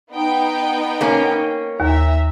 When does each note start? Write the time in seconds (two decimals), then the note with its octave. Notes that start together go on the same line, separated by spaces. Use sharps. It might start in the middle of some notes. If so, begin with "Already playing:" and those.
0.12 B3 D#4 G5
1.01 A#3 C#4
1.80 D#2 E5 A#5